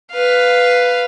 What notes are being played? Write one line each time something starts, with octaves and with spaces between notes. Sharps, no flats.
B4 F5